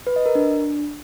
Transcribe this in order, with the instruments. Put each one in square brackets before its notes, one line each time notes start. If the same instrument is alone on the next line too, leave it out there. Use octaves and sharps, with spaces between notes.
[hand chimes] B4
D#5
A#4
D4